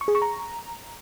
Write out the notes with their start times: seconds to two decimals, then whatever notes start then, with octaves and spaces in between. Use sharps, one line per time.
0.01 C#6
0.08 G#4
0.15 C#6
0.22 A#5